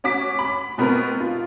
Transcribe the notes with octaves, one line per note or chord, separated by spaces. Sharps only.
C#4 F#4 D6 B6
B5
B2 B3 C4 A#4
F4